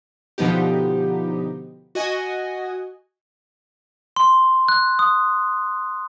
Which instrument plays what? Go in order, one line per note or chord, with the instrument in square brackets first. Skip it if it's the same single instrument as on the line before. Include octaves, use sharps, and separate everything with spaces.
[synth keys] B2 D3 F3 B3 D#4 G4
F#4 D#5 G#5
[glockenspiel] C6
F#6
D#6